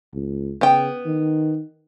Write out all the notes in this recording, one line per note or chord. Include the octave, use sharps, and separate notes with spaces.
C#2
C#3 B3 G5
D#3